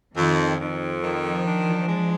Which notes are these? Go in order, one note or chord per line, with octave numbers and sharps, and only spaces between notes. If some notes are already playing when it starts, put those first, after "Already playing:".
F2 D#3
F2
D#3 F3
D4
G#3